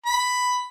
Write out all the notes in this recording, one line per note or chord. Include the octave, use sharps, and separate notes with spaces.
B5